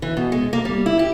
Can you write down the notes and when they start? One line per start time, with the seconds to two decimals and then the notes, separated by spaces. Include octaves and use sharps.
0.02 E3
0.17 B2
0.32 G#3
0.53 A#3
0.65 G3
0.86 E4
0.99 G4